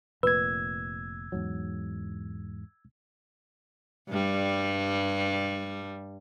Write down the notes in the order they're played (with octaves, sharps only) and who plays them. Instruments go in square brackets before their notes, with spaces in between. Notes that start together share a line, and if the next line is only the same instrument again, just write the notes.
[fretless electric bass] F1 A#2 [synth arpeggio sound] B4 [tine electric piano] E6 G#6
[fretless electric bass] E2 G#2 F#3
[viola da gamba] G2 G3